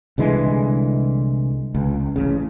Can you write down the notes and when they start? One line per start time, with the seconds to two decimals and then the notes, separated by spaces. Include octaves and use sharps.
0.18 C2 D3 E3 G#3
1.75 C#2
2.16 A1 C#3